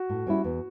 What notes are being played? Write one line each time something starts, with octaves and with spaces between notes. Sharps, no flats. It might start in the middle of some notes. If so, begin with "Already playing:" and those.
Already playing: F#4
A2
G3 C#4 E4
E2